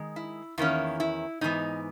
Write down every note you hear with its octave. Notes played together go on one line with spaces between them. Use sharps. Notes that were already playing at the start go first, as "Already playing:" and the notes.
Already playing: D#3 G#3
E4
E2 D#3 A#3 C#4 E4
E4
G#2 E3 B3 D#4